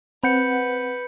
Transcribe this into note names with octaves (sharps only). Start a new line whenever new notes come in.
C4 B4 F#5 B5 G6 C#7